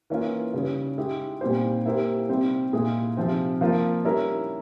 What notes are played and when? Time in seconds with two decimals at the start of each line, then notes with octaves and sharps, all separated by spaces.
0.10 E3 A#3 C#4 F4
0.54 C#3 G3 C#4
0.98 G#3 E4 G4
1.41 A#2 G3 C4 G4 C5
1.86 A#3 E4 G4 C5
2.29 C3 G3 C4 G4 C5
2.73 A#2 G#3 E4 G#4
3.17 C3 F3 C4
3.61 F3 A#3 F4
4.05 G3 C#4 E4 A#4